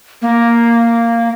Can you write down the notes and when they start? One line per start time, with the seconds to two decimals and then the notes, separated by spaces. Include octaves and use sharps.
0.22 A#3